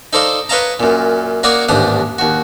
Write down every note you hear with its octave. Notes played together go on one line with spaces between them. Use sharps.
D#4 A4 C5 D5 D#5 F5
B4 C#5 D#5 F5 A5 A#5
F#2 A#2
A#3 F#4 C#5 D5 D#6
A1 D#2 G#2 D4 D#6
D#2 F#4